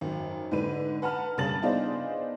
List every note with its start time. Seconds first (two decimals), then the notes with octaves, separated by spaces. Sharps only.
0.01 G#1 F#2
0.51 G#2 D3 B4 D#7
1.02 B4 F#5 A5 A#5 F6
1.37 G2 C#3 A#3 A5 A6 F#7
1.62 B3 D4 D#4 F4 G#4 C5